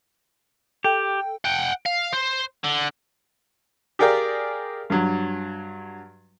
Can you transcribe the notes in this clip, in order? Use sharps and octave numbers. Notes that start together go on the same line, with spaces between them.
G4 A4 G5
F#5 G5
F5
C5
D3
G4 G#4 A#4 D5 F5 G5
G2 F#3